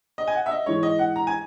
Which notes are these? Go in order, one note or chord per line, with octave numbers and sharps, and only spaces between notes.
D#5
G#5
F#5
E5
D#5
G#2 E3 C#5
D#5
F#5
A#5
G#5